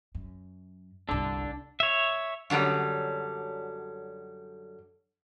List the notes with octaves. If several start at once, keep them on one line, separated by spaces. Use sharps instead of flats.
F#2
G1 C2 D4 A4
C#5 E5
F#2 D3 F#3 G3